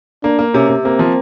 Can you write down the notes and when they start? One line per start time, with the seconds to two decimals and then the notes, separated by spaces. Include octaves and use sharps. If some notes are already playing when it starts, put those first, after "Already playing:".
0.23 A#3 D4
0.39 A#3
0.54 C3 C#4
0.69 C3
0.84 A#3 C4
0.99 F3